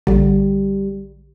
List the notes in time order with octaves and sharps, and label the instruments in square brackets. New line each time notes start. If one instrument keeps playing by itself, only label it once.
[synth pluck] A#1 D3 [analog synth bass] G3